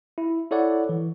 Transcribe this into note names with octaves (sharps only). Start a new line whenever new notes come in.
E4
E4 A4 C#5 D5 F#5
E3